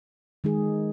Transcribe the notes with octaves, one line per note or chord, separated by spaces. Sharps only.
D#3 G#3 D#4 G#4